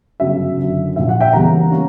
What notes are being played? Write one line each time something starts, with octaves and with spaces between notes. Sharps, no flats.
G1 F#2 C#3 F#3 C#4 E5
F#1 F#2 D3
A#1 A#2 A#3 E5
F#5
E5 G5
E1 E2 C#3 G3 A#3 F#5 A#5
G3 A#3 C#4